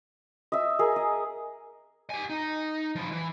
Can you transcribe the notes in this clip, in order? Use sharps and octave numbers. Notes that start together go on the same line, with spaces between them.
D#5 E5 E6
G#4 A#4
D#5
G4 G#5
D#4
F3 E4
E3